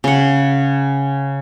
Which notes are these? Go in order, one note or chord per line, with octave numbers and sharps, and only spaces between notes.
C#3 F#5